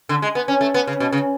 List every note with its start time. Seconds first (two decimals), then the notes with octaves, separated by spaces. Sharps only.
0.09 D3
0.22 G#3
0.35 B3
0.48 C#4
0.61 A3
0.74 B3
0.87 C#3
1.00 B2
1.13 C#3